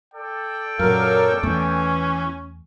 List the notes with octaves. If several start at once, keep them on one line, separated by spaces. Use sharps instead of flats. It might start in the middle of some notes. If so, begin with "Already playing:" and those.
A4 D5 G5
F#2 A#2 F#3 A#4 F5
E2 E3 A3 C#4